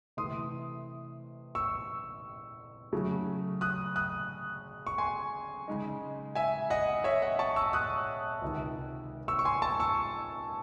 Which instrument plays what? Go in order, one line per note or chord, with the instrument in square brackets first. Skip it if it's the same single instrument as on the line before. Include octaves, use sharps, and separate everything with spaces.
[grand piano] C3 E3 A3 C6 D#6
C#6 E6
C#3 F#3 A3
D#6 F#6
D#6 F#6
C#6
G#5 C6
C#3 G#3 D#4
E5 G#5
D#5 F#5
C#5 E5
D#5 F#5
A5 C#6
C#6 E6
D#6 F#6
C#2 C3 D#3
C#6 E6
C#6
G#5 C6
A5 C#6
C#6 E6